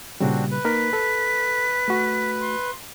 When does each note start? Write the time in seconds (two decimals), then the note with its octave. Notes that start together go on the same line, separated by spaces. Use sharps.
0.20 A#2 C#3 G3 C4 D4 F#4
0.51 B4
0.65 A#3 D#4 A#4 B6
0.93 A4
1.88 A3 F#4
2.41 C6